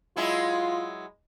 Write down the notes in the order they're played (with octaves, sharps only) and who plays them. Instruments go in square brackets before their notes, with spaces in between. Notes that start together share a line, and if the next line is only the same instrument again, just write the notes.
[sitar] F#3 G#3 E4 [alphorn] F4